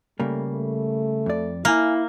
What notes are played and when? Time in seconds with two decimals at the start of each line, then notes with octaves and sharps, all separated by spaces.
0.20 C#3 G3 A3 A#3
0.52 A3
1.26 F2 D5
1.65 A#3 E4 F5 G#5